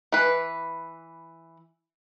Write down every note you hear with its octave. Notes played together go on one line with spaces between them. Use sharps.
E3 B4